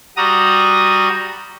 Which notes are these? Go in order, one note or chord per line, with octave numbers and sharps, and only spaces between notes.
G3 F#4 A#5 D#6